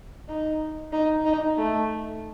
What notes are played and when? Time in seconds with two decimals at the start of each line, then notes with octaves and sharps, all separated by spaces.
0.29 D#4
0.92 D#4
1.25 D#4
1.58 A3